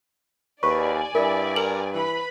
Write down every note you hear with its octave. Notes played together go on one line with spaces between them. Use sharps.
D#2 B4 D5 G#5 C#6
G2 E4 A#4
A#4 F#7
E3 B4 B5